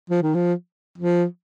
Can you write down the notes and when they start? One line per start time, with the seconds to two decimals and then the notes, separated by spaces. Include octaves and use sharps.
0.10 F3
0.22 D#3
0.34 F3
0.98 F3